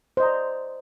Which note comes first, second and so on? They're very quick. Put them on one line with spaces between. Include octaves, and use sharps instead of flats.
C5 D#5 A#5 D5